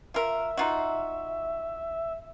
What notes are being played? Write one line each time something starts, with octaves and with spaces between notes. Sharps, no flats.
F4 A#4 E5
D#4 F4 F#4